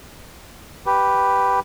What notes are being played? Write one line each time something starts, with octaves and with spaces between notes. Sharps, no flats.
G4 B4